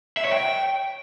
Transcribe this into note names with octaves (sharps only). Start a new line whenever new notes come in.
E5
C#5
G5